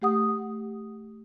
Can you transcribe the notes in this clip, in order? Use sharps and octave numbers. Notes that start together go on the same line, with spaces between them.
A3 G4 F#5 D#6